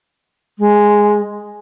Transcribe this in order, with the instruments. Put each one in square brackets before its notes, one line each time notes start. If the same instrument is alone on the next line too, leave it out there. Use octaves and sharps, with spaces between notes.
[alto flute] G#3